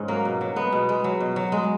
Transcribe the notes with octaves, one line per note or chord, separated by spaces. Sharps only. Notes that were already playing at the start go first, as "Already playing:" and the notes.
Already playing: G#2 C#4
F#3 A#3
B2
F#3
G#3 B3
B2
G#3
F#3
B2
F#3
G#3